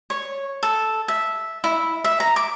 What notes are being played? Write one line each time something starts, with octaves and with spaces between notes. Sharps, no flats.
C#5
A4
E5
E4
E5
A#5
D6